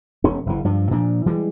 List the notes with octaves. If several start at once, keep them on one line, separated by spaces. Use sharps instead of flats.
E1 C#4
F#1 E3
G2 F3
A#2 F3 D4
E3 G3 G#3